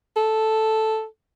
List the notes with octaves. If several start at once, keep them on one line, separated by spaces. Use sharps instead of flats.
A4